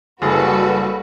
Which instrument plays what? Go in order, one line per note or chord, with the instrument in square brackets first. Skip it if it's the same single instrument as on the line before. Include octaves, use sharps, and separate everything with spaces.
[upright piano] F#1 G#4 [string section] G3 F#4 B4 [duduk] A4